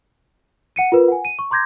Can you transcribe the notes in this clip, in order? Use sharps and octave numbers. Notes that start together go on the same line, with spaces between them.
F#5 C#7 D#7
F4 A#4 B4
F#5 G#5
D#7
C#6
A#5 C6 D6 G6 G#6 A#6